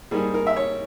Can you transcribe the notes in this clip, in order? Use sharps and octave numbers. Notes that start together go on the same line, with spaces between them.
G#2 G3 A#3 G#4
A#4
E5
C#5